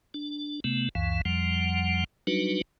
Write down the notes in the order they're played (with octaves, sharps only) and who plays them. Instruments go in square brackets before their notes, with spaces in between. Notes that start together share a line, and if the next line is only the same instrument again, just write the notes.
[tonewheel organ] D4
C3 A3 B3
C#2 F#2 E3 F5
F2 F3 G3 F#5
F#3 G3 D4 D#4 F#4 B4